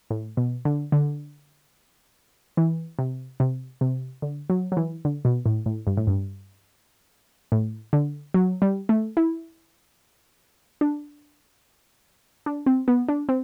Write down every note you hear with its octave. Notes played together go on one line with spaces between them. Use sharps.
A2
B2
D3
D3
E3
C3
C3
C3
D3
F#3
F#3
E3
D3
B2
A2
A2
G2
A2
G2
A2
D3
F#3
G3
A3
E4
D4
D4
C4
B3
D4
C4